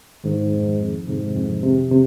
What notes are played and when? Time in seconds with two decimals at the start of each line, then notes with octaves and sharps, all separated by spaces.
0.24 G#2 D#3
0.52 F2
0.80 F2
1.07 G#2 C3
1.36 F2
1.63 C3
1.91 C3